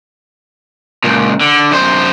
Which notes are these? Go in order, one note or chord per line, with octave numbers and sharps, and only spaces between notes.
C#2 A#2
D3
F#2 C5